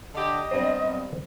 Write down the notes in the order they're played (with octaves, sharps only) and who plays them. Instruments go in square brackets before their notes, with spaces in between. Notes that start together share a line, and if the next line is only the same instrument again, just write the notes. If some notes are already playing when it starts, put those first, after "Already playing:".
[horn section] D3 G4 [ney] D#5
[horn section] G2 [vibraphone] F#3 B3 C4 [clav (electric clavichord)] C5 D5